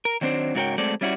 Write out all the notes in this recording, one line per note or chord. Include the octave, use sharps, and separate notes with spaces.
A#4
D#3 F#3 C4 D4 C5
G#2 C#3 F#4 A#4 C#5 G5
F#3 G#3 A3 C4 A4 D5
G3 C#4 E4 F#4 D5